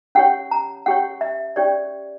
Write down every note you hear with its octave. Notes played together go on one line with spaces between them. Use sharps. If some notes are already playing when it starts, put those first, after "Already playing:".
C#4 G4 C#5 F#5
A#5
C#4 G4 C#5 F#5
E5
C#4 G4 C#5 D5